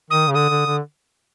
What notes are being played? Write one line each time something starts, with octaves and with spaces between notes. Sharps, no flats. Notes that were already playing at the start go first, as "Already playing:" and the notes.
D#3 D#6
C#3
D3 D#6
D3
D3